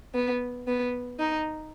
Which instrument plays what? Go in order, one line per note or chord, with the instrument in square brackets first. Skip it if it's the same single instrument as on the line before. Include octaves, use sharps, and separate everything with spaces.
[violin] B3
B3
D#4